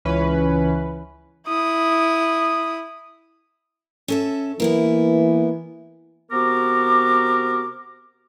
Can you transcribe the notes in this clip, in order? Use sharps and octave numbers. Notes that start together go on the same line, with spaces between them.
C#2 E3 C#4 B4
E4 D#6
C#4 A4 E5
E3 A#3 B3 E4
C3 B3 F#4 A#4 A#5 D6